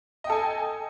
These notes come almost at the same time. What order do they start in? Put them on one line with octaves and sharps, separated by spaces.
D#5 G5 A4 G#5